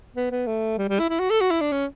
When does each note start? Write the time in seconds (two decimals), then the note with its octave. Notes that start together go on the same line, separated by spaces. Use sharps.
0.16 B3
0.31 B3
0.47 A3
0.78 G3
0.89 G3
0.99 E4
1.10 E4
1.20 F#4
1.30 A4
1.41 F#4
1.51 E4
1.61 D4
1.72 C#4